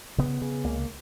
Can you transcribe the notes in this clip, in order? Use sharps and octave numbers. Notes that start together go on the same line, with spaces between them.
C#3 B3
C#3
C#2 A#3